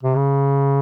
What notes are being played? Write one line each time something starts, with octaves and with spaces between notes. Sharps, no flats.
C3
C#3